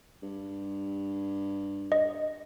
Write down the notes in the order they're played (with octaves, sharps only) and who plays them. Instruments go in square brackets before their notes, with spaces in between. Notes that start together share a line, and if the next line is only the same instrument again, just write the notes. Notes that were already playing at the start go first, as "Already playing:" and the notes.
[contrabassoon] G2
[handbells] D#5